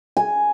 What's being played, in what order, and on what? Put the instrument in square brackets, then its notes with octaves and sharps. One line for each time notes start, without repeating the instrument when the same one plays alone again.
[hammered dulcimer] G#5